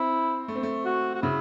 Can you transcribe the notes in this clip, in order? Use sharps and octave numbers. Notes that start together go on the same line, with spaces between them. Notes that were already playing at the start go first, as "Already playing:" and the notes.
Already playing: C4 E4
A3
C4
A3
F#4
F#4
C#3 E4